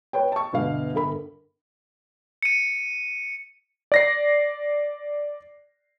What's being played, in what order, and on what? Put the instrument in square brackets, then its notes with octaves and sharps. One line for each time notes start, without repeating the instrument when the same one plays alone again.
[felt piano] B4 C#5 G5
A5 C#6
G1 B2 F5
G1 A4 A#4 B5
[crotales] C#7 D#7
[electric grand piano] D5 A#6 C7